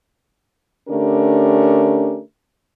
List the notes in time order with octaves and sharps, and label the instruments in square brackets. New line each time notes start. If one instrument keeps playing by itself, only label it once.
[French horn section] D3 A3 C#4 D4 G4 A#4